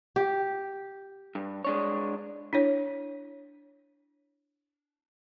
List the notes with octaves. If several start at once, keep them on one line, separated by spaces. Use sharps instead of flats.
G4
G2
G#3 D4 C#5
D4 E4 C#5